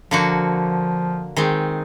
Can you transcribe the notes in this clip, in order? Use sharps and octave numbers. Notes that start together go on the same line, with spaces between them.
D3 F3 A#3 F#4
D#3 G#3 C4